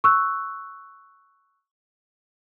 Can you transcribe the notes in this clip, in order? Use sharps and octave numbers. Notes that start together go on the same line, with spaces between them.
C#6 E6 F#6